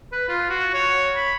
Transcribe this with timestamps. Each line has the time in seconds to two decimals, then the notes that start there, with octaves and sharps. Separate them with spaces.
0.12 B4
0.28 F4
0.49 F#4
0.74 C#5
1.16 B5